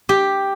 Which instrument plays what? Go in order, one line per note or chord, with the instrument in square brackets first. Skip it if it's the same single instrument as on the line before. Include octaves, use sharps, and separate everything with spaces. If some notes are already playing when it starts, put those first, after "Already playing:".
[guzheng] G4